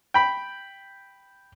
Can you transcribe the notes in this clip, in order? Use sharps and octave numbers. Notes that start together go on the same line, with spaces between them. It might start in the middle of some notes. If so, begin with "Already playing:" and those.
G5 B5